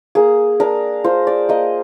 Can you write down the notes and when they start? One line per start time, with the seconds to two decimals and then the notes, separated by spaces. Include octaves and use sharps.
0.15 A#3 G#4
0.60 D4 A#4
1.04 F4 C5
1.27 D5
1.49 A#3 D#5